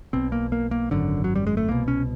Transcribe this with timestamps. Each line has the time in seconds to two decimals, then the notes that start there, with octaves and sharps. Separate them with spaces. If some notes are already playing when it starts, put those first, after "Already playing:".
0.13 B1 B2 C4
0.32 A#3
0.52 A#3
0.71 A#3
0.91 G#1 F#2 D3
1.24 F#3
1.36 G3
1.47 G#3
1.57 A3
1.68 C2 B2 A#3
1.88 C#4